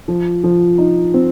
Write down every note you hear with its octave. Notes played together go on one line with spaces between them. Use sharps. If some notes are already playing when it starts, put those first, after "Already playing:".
F3
F3
D#4
C4